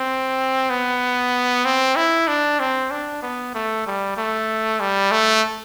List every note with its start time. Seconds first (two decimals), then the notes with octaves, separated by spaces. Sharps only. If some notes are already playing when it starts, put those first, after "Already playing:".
Already playing: C4
0.70 B3
1.65 C4
1.96 E4
2.28 D4
2.59 C4
2.91 D4
3.22 B3
3.54 A3
3.86 G3
4.17 A3
4.80 G3
5.11 A3